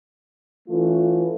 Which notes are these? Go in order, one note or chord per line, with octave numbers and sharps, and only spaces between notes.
E3 A3 C#4 F4